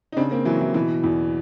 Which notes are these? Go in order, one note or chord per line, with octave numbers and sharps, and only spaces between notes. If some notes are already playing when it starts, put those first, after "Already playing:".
D#4
C#3 C4 D4
A#3 C4
E3 F#3
E3
B2 E3
E2